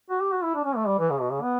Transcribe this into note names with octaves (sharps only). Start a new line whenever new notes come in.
F#4
G4
F#4
E4
D4
C#4
A3
G3
E3
C#3
B2
C#3
B3